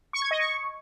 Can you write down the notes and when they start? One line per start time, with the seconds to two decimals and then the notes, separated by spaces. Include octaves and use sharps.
0.13 C#6
0.22 G#6
0.31 D#5
0.39 C#6